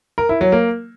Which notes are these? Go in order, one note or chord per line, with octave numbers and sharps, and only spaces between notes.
A#4
E4
F#3
A#3